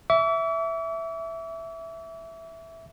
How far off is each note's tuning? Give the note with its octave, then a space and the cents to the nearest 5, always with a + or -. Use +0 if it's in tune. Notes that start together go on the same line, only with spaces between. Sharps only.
E5 +0 D6 -45